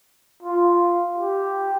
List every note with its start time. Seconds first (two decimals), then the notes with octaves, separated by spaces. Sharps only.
0.43 F4
1.18 G4